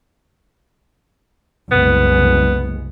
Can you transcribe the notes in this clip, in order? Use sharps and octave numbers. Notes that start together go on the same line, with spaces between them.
F#1 C2 G#3 B3